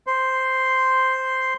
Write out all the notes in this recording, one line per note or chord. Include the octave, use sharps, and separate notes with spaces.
C5